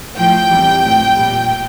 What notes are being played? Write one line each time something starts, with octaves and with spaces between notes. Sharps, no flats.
A2 F3 G5
E2 C3 E3 G3
A2 F3
A#2 G3